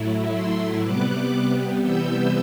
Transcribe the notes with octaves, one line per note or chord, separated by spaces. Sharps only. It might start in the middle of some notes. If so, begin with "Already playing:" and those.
Already playing: A2 F#3 A3 E4
C6 E6
C3 G3 B3 D6 F#6
C3 E3 G3 B3 E6 G6